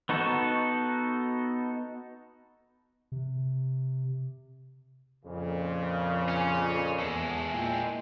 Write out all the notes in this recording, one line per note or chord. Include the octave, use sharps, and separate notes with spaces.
B3 D#4 F#4 A4
C3
F2 A#2 C#3
C#4
E2 G#3 A4
A#2 E4 G5